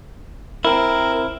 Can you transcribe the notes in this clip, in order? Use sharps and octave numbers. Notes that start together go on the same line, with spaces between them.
C4 E4 A#4